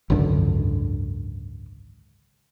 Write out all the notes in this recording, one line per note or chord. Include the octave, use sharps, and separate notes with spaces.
G#1 C#2 F#2 D3